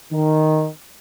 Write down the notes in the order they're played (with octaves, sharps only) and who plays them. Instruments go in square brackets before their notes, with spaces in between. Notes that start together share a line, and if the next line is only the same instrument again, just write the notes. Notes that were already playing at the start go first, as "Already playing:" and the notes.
[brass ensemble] D#3